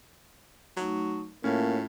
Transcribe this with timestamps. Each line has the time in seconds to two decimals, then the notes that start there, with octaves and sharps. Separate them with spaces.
0.77 F#3 A3 D#4 C#6
1.44 A2 A#3 C#4 F4 E5 A5